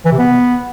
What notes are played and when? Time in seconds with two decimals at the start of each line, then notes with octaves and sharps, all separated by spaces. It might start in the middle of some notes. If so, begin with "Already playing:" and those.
0.05 E3
0.12 C3
0.18 B3